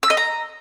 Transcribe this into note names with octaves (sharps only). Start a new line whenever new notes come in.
E6
D#5
A#5